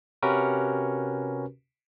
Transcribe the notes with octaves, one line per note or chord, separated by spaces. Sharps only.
C3 C#4 F#4 G4 A#4 B4